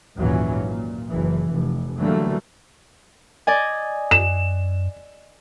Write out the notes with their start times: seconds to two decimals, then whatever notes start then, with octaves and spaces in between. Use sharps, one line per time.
0.17 G#1 D#2 A#2 E3 F#3 C#4
0.66 A#2
1.10 F#1 E3
1.52 F1
1.98 D3 E3 F#3 G3 A3 A#3
3.47 D5 D#5 G#5
4.11 F#2 E7